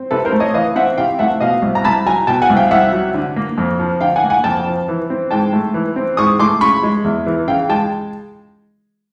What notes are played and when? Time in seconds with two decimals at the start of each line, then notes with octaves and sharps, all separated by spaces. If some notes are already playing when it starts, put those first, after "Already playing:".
Already playing: C4
0.11 C3 A4 B4
0.25 A#4 C5
0.32 A3
0.40 C#5 D#5
0.54 E3 D#5 F5
0.75 C4 E5 F#5
0.98 C3 F5 G5
1.19 A3 E5 F#5
1.40 B2 D#5 F5
1.62 C2
1.75 A#5
1.84 C2 A5 B5
2.06 F#3 G#5 A#5
2.27 B2 G5 A5
2.42 F#5 G#5
2.50 C2
2.57 F5 G5
2.71 C2 E5 F#5
2.92 F#3
3.14 D3
3.36 A#3
3.58 F2
3.80 F3
4.01 D3 F5 G5
4.16 F#5 G#5
4.23 A#3
4.30 F#5 G#5
4.44 F2 G5 A5
4.67 F3
4.88 E3
5.10 C4
5.31 G#2 G5 A5
5.53 A3
5.74 E3
5.96 C4
6.17 G#2 C#6 D#6
6.39 A3 C6 D6
6.61 C#3 B5 C#6
6.83 G#3
7.04 E2
7.26 E3
7.48 C#3 F5 G5
7.69 G#3 G5 A5